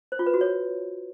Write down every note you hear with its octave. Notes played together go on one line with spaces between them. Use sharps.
C5
F4
B4
F#4
C#5